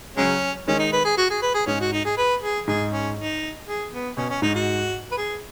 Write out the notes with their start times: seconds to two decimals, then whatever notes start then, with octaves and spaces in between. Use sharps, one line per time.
0.17 C#3 F#3 G#3 C#4
0.67 D#3 G#3 C#4
0.79 D#4
0.92 B4
1.05 G#4
1.17 F#4
1.30 G#4
1.42 B4
1.54 G#4
1.67 G#2 C#4
1.80 F#4
1.92 D#4
2.05 G#4
2.17 B4
2.42 G#4
2.67 G#2 G#4
2.93 C#4
3.17 D#4
3.68 G#4
3.92 B3
4.17 B2 C#4
4.30 C#4
4.42 G#2 D#4
4.55 F#4
5.11 B4
5.17 G#4